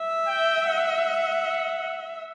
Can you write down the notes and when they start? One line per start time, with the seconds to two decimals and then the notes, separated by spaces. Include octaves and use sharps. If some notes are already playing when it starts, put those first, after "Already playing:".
Already playing: E5
0.28 G5
0.66 F#5